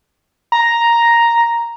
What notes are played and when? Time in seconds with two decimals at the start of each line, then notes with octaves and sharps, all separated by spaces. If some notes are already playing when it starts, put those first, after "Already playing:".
0.52 A#5